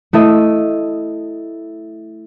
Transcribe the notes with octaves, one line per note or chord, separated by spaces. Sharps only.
A3 E4 A4 D#5